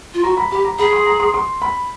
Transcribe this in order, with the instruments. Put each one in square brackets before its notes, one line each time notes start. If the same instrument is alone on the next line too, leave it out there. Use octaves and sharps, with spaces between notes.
[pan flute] F4
[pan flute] F#4 [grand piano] A#5
[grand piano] B5
[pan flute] G4 [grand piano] B5
[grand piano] A#5
[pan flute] G#4 [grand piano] B5
[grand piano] C6
A#5
C6
C6
B5